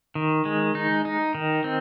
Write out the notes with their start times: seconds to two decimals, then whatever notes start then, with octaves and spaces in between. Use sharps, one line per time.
0.15 D#3
0.45 G#3
0.75 D#4
1.05 D#4
1.35 D#3
1.64 C4